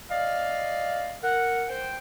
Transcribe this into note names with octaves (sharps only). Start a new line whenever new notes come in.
D5 D#5 F5
A#4 F#5
C5 G5